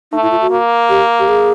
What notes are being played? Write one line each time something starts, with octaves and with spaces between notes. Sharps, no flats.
A3 D#4
E4
F4
F#4
A#3
G4
G4
G#4